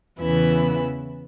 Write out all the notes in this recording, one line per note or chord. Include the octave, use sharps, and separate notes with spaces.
E2 C#3 E3 B3 E4